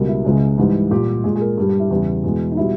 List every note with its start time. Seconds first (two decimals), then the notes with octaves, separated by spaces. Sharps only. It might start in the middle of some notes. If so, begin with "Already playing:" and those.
Already playing: C#2 B2 G3 A#4
0.08 E4
0.25 C#2 C#3 G#3
0.58 G#2 E3 G3
0.91 A#2 G3 G4
1.24 A#2 G#3 G#4
1.36 G#4
1.41 A#4
1.58 G2 G3
1.69 G4
1.79 E4
1.91 E2 C#3 G3
2.24 E2 B2 G#3
2.51 D#4
2.57 B2 G3 E4